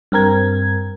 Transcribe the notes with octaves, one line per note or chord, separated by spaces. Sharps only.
G2 C4 A#4 G#6